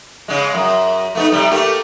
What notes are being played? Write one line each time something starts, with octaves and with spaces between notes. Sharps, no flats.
C#3 G#3
F#2
A3 B3 D#4
C3 G3
A3 A#3 G4